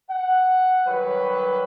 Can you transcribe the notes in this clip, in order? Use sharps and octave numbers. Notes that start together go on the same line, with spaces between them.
F#5
D#3 F#3 G3 B4